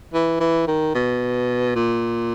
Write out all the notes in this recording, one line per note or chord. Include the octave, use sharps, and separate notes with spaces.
E3
E3
D#3
B2
A#2